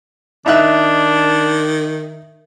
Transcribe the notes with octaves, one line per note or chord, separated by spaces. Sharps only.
D#3 D4 D#4 E5 F#6